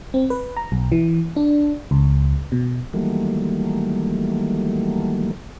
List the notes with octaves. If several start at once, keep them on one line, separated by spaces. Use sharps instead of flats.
C4
B4
A#5
B1
E3
D4
C#2
B2
D#3 E3 F#3 G3 A3 A#3